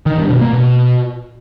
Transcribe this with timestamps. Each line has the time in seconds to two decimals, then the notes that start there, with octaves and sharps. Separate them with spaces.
0.06 D#3
0.18 G2
0.29 B2
0.41 A#3
0.53 B2